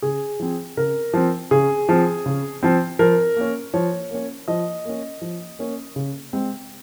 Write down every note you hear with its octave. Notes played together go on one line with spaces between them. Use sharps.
C#3 G#4
F3 C4
C#3 A#4
F3 C4
C#3 G#4
F3 C4
C#3
F3 C4
F3 A#4
A#3 C#4
F3 C#5
A#3 C#4
F3 D#5
A#3 C#4
F3
A#3 C#4
C#3
G#3 C4